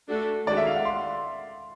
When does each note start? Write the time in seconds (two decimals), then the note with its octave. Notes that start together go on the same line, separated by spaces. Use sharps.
0.09 A3 D4 F#4 A4
0.47 D#3 G#3 C#4 F#4 A4 D5
0.57 E5
0.66 F5
0.76 F#5
0.85 C6